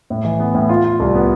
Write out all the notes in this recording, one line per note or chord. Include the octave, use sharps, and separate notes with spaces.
A2
E3
B3
A2
F4
F4
C2
B3